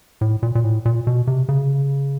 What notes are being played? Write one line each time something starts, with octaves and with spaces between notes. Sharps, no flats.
A2
A#2
A#2
A2
A#2
B2
C3
C#3